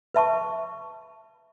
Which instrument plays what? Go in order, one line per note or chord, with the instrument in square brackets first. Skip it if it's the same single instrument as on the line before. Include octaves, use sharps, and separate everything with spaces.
[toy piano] B4 E5 A5 C#6